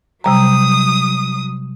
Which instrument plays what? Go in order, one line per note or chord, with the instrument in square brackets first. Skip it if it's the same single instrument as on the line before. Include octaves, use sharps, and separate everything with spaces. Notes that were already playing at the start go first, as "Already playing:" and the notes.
[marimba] C3 G3 A#5 [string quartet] F#3 D#6